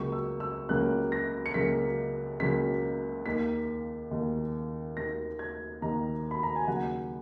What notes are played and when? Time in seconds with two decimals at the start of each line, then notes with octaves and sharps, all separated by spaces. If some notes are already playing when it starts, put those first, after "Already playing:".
Already playing: C#2 C#3 F#3 A#3 C#6
0.12 E6
0.40 E6
0.69 C#2 C#3 F#3 A#3 F#6
1.12 A#6
1.46 C#7
1.54 C#2 C#3 F#3 A#3 B6
2.40 C#2 C#3 F#3 A#3 B6
3.26 D#2 D#3 A#3 B6
4.11 D#2 D#3 A#3
4.97 D#2 D#3 A#3 A#6
5.39 G#6
5.82 D#2 D#3 A#3 A#5
6.31 B5
6.43 A#5
6.56 G#5
6.67 D#2 C#3 F#3 F#5